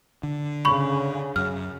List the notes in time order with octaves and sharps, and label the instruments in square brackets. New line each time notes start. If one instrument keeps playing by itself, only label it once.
[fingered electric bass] D3
[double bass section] C#3 [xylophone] B5 C#6
[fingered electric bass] F#2 [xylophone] F6